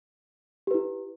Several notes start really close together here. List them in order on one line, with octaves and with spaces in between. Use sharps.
G4 B4 E4